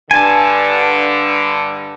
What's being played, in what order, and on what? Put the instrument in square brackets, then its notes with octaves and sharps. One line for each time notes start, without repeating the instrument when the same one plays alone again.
[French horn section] G2 D3 [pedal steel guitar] G#5 A5